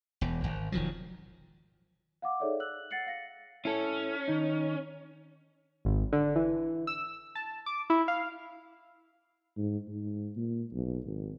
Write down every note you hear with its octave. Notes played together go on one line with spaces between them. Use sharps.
E1 E2
G#1
E1 D#3 F3 F#3
F5 F#5 D6
D#4 G#4 A4 C#5 D5 E5
E6 F#6 F#7
F#5 A6 C7 C#7 F#7
F5 A#6 C#7
C#4 E4 A4
D#3 D#4
G#1
D3
E3
E6
A5
D6
E4
F5
G#2
G#2
A#2
B1
G#1